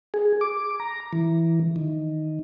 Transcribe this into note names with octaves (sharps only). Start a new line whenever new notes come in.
G#4
D6
A#5
E3
D#3